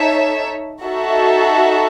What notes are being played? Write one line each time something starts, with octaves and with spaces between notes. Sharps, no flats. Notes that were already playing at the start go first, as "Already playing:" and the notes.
Already playing: D#4 A4 C#5 E5
D#4 F#4 A4 E5